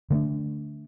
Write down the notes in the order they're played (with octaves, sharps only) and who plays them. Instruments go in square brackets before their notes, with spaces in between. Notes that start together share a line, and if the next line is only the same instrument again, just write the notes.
[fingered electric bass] D3 A3 C4 D4